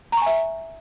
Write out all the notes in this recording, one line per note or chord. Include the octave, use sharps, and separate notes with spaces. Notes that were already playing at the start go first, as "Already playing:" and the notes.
E5 G#5 A#5 C#6